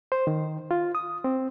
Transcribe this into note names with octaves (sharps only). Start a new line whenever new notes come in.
C5
D#3
F4
D#6
C4